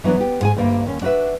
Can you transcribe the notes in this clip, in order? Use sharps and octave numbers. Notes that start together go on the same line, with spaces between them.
E3 F#3 B3 D4
B3 G4
G#2 G#4 G#5
D2 G2 G3 A#3
D#2 C#4
D4 F#4 A#4 B4 E5